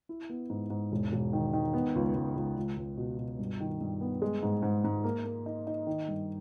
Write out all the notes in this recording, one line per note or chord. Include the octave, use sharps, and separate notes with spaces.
E4
B3
G#2
G#2
E1
E1
D#3
D#3
B3
C#2
C#2
C#2
C#2
C#2
B2
B2
G2
D#3
G2
B3
G#3
G#2
G#2
G#2
A#3
A#3
D#4
D#4
D#3
G2